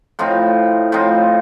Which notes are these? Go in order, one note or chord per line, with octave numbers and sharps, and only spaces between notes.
A2 F3 C4 D#4
A2 F3 C4 D#4